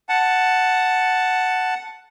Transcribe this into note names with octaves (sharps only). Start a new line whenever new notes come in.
F#5 A5